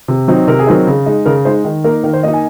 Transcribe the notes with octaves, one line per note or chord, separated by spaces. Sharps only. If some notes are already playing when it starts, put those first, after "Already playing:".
C3
F#3 C4 D#4
C3 A#4
G#4
F#3 C4 D#4 A#4
C#3
G#3 D#4
C#3 A#4
G#3 D#4 C5
D#3
A#3 D#4 A#4
D#3 A#4
C5
A#3 D#4 D#5
G#5